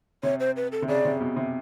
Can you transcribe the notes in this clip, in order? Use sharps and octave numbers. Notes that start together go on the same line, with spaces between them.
C3 C#5
C5
B4
A4
C3
C#3 D5
C3
B2
C3